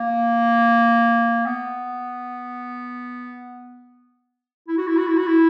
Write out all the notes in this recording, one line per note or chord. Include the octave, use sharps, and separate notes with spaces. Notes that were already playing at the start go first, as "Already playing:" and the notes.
Already playing: A#3
B3
E4
F#4
E4
F#4
E4
F#4
E4